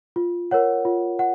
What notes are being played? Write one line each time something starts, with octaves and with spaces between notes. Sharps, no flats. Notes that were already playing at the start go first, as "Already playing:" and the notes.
F4
A#4 C#5 F#5
F4
F#5